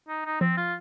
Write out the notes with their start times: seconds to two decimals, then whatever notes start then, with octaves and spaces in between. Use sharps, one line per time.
0.09 D#4
0.26 D#4
0.41 F3 C4
0.57 F4